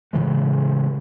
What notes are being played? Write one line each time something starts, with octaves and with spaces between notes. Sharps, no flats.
A2 C#3 E3 G#3